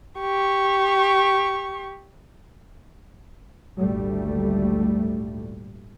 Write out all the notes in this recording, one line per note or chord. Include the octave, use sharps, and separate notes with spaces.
G4 C#6
G#1 D2 A#2 G3 A3